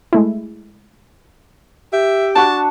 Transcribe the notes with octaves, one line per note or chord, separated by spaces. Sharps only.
G#3 A3 E4
G4 E5
D4 F#4 A5